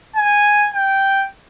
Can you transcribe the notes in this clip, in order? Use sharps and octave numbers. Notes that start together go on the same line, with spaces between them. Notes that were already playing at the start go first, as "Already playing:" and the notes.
G#5
G5